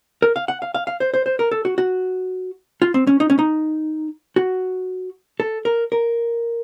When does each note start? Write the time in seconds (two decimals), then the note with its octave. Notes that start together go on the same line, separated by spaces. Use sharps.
0.22 A#4
0.36 F5
0.48 F#5
0.62 F5
0.74 F5
0.87 F5
1.00 C5
1.14 C5
1.26 C5
1.39 A#4
1.52 A4
1.65 F#4
1.78 F#4
2.82 F4
2.94 C4
3.07 C#4
3.20 D#4
3.30 C#4
3.39 D#4
4.36 F#4
5.40 A4
5.65 A#4
5.92 A#4